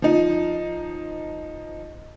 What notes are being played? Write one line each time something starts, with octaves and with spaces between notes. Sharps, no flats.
F3 D#4